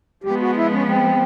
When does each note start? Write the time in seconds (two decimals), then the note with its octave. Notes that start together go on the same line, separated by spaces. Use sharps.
0.24 F3 G#3 B3 G4
0.40 F#4
0.56 E4
0.72 C#4
0.87 C4